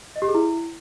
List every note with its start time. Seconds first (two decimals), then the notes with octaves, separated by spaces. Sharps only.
0.16 D#5
0.22 G4
0.28 G#4
0.34 E4